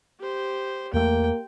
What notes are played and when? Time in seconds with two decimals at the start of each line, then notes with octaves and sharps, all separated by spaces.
0.20 G4 C5
0.94 E2 A3 A#3 G5